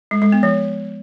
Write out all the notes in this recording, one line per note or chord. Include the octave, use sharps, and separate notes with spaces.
G#3
G#3
B3
F3